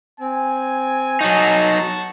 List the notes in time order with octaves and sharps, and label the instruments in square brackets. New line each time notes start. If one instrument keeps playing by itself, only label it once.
[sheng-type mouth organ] C4 [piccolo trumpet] G#5
[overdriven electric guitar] F#3 D#4 [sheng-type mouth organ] F#5 A5 C#6